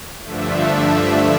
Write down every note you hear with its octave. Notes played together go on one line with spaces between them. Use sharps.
G2 D3 F3 A3 D4 E5